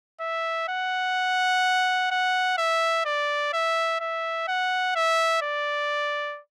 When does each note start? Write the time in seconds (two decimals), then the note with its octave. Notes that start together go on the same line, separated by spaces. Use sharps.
0.21 E5
0.69 F#5
2.11 F#5
2.58 E5
3.05 D5
3.53 E5
4.00 E5
4.48 F#5
4.96 E5
5.42 D5